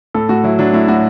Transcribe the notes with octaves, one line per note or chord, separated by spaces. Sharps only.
A2 A4
A2 F#4
F#3 E4
F#3 D4
A2 E4
A2 F#4